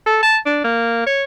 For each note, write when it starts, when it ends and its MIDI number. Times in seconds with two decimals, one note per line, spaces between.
0.06 0.22 69
0.23 0.37 81
0.46 0.63 62
0.64 1.06 58
1.06 1.24 73